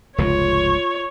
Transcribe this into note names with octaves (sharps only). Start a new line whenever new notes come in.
F1 C#2 G#2 F4 C#5